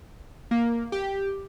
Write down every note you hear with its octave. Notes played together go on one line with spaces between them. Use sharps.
A#3
G4